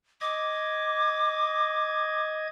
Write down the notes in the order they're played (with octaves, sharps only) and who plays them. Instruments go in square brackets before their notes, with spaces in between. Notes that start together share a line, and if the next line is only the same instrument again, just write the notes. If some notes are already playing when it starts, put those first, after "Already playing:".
[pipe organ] D#5 G#6 [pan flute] D6